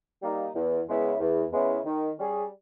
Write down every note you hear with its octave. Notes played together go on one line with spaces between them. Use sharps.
G3 A#3 D#4
E2
C#3 G#3 B3 E4
E2
C#3 G#3 B3 E4
D#3
G3 C#4 G#4